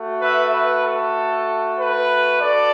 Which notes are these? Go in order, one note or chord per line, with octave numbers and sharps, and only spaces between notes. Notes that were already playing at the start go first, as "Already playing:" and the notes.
Already playing: A3 F#4
B4 E5
B4
A4
B4
D4 F#4 A4 D5